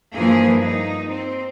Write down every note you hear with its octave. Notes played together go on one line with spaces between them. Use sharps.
G2 E3 F3 A#3 G#4
D#4
C4